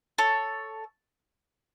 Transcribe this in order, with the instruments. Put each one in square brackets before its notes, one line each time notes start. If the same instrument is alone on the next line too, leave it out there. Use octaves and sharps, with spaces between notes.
[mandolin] A4 C#5